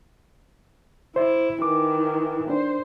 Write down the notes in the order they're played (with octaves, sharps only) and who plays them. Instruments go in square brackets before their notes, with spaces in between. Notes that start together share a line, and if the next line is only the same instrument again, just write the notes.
[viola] E4 [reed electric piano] C5 E5
[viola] D#3 E3 [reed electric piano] D6
[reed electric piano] D4 [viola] C5